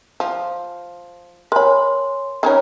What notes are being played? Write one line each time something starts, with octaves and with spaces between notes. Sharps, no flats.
F3
A#4 C#5 G#5 B5 C6
D#3 C#4 A#4 C#5 B5